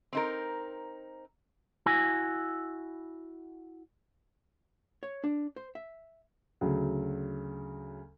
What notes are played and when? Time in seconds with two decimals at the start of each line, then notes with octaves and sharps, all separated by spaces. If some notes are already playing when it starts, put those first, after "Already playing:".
0.13 C4 D#4 A#4
1.86 E4 F#4 G#5
5.03 C#5
5.24 D4
5.56 C5
5.75 E5
6.61 D2 C#3 F#3